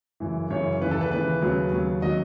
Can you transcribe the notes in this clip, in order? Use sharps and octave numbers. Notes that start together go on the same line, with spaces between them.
F#2 C#3 E3
F#2 C#3 E3 C#5
D#2 C#3 E3 B4
A4
B4
D#2 C#3 E3 B4
D#2 C#3 F#3
D#2 C#3 F#3
D#3 F#3 D#5